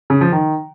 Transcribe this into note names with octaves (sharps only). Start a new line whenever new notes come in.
C#3
F3
D#3